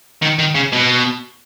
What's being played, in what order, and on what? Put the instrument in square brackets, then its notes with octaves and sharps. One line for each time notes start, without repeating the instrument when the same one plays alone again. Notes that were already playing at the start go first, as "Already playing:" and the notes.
[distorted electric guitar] D#3
D#3
C#3
B2